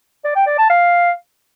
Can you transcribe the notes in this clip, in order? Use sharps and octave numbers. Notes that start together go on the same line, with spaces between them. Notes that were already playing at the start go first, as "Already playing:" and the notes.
D5
G5
D5
A5
F5